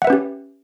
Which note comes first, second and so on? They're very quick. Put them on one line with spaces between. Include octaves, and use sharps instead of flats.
F#5 E5 B4 C#4 G4